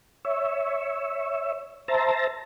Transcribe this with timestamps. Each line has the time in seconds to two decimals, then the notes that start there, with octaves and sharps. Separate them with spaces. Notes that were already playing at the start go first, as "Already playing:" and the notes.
0.25 C#5 E5
1.88 C5 E5 A5 A#5